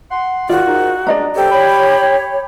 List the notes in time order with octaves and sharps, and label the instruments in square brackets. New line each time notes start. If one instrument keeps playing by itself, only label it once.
[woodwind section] F#5 C6
[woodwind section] D#2 G#2 D#3 [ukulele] F4 D5 [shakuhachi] F#4
[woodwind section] G#2 D#3 D#4
[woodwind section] G#3 C#4 D4 [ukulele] D5 D#5 A#5
[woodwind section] C#3 C4 A4 [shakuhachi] G4
[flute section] C#5 [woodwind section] B5